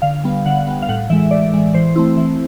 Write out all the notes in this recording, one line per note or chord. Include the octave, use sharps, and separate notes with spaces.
D3 F5
G3 B3
D3 F#5
G3 B3
F5
A2 F#5
E3 G#3 E5
A2 D5
E3 G#3
E3 C5
A3 C4 E4
E3